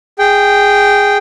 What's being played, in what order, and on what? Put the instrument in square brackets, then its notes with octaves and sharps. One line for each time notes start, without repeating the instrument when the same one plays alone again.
[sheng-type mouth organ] G#4 G5